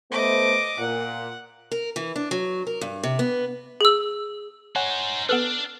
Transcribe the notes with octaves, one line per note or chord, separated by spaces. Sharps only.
A3 B3 C5 D#5 D6
A#2 F#5
A#4
E3
D4
F#3
A#4
G2
C3
B3
G#4 E6
D#4 C5 C#5 F#5 G#5
B3 D4 A4 B4 F6